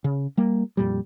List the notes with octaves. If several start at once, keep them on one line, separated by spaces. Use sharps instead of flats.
C#3
G3 A#3
F2 A#2 G3